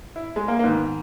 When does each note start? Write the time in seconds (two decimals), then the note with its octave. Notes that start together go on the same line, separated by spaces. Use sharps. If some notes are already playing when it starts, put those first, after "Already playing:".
0.16 E4
0.36 G#3
0.48 A#3
0.59 A#3
0.63 G#2 D#3 B3